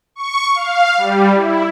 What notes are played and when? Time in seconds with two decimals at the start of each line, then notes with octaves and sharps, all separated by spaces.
0.16 C#6
0.54 F5
0.98 G3
1.35 E4